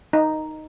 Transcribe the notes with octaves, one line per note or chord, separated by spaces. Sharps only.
D#4